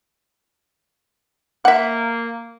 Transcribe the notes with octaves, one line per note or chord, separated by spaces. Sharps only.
A#3 E5 F#5